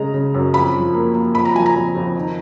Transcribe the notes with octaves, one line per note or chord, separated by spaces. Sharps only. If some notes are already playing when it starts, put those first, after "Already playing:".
Already playing: C#3 G#3 A#5
C#3
F#2
F2 B5
F3
A#3
A#3
F2 B5
A#5
F3 G#5
A#5
F2
F2
D#3